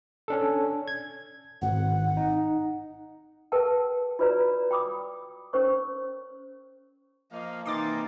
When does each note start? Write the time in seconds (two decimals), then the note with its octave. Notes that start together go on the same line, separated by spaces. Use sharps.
0.28 C#4 D4 A4
0.88 G#6
1.62 G#1 F#5
2.17 D#4
3.52 G#4 A#4 B4 F#5 G5 A5
4.19 F4 F#4 B4 C#5 D5 A#5
4.71 G5 B5 D6 D#6
5.53 C#4 A#4 C5 C#5 C#6
7.32 F3 A#3 D#5 F5
7.66 C3 E3 A#3 D#4 A#4 C6 D6 A6